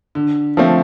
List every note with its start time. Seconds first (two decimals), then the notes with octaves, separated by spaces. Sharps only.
0.15 D3
0.57 F3 A3 C4